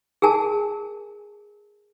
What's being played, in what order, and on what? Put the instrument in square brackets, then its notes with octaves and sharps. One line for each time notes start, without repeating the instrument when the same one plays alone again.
[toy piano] G#4 A#4 G#5 A5